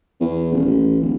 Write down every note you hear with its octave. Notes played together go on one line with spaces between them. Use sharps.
E2
D#1
A1
D1